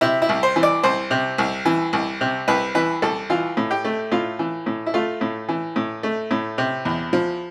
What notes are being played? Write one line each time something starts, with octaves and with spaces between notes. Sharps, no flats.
C3 E4
E4
C2
C5
E3
D5
C2 C5
C3
C2
E3
C2
C3
C2 B4
E3 B4
C2 A4
E3 F4
A2
G4
A3
A2 F4
E3
A2
E4
A3 F4
A2
E3
A2
A3
A2
C3
E2
F3